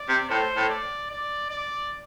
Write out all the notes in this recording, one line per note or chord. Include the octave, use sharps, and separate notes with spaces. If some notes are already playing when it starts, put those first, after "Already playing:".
Already playing: D5
C3
A2 C5
A2
D5
D5
D5